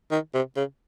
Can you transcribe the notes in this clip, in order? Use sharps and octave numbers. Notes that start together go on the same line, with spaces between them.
D#3
C3
C#3